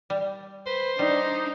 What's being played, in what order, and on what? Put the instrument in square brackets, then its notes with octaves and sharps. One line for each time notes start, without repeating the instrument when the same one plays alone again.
[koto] G3
[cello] B4 [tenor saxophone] C5
[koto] G3 [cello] D4 [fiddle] D#4